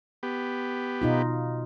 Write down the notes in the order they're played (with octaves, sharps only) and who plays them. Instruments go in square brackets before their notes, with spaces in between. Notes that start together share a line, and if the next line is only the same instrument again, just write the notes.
[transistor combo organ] B3 G4
[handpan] B2 D#4 F4